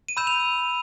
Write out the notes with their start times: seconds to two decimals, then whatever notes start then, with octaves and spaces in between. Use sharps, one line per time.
0.09 D#7
0.17 B5 E6 G6 E7
0.27 F7